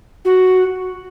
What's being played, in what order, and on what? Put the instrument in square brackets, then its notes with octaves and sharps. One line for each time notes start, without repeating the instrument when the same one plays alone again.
[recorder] F#4